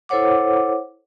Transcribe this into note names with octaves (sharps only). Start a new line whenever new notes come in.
E4 A4 C5 C#5 F#5 D6